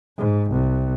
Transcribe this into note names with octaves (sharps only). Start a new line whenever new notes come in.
G#2
C2